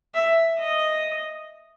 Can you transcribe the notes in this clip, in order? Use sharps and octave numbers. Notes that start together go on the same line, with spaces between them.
E5
D#5